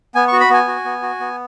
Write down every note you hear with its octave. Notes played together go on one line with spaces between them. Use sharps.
B3 G#5
C#6
F#4
B5
B3 G#5
F#4
B3
F#4
B3